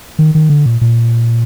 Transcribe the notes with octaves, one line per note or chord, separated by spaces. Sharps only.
D#3
D#3
D3
A#2
A#2